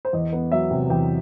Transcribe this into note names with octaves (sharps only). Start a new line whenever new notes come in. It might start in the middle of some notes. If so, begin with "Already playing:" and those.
C5
E2 D#5
B3
F#3 E5
C3
E2 G5